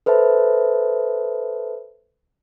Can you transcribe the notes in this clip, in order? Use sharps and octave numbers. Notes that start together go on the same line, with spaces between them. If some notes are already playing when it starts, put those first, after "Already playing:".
A4 B4 C5 E5 A5